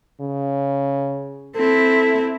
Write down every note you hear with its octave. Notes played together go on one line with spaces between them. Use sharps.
C#3
C4 E4 A4